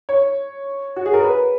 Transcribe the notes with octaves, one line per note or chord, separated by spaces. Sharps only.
C#5
F#4
G#4
A#4
B4